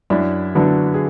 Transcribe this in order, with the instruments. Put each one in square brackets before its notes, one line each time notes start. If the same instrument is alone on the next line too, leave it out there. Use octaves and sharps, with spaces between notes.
[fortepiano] F#2 [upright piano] D4 E4
[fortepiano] D3 F#3 B3 [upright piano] D4 E4
[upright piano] G#4